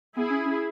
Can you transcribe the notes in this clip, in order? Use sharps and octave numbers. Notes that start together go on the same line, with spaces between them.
B3 E4 G#4
C#4
C#4